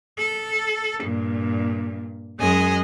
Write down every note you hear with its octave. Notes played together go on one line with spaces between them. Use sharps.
A4
G2 A#2
F#2 G#3 D#5 G#5